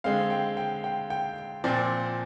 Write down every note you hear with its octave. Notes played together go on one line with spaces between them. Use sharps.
D3 G#3 C4 F5
G5
G5
G5
G5
A#2 F3 C4 D5